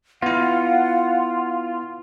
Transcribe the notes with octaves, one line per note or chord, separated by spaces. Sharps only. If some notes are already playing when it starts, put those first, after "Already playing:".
B3 E4 F4 F#5